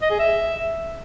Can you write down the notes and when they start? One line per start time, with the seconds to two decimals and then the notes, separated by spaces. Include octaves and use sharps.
0.02 D#5
0.10 G#4
0.19 E5